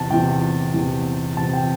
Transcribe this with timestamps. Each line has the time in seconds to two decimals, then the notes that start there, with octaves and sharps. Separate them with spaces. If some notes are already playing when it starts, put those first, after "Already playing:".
Already playing: E2 C3 E3 A5
0.10 E2 C3 E3 G5
0.74 E2 C3 E3
1.37 E2 C3 E3 A5
1.53 G5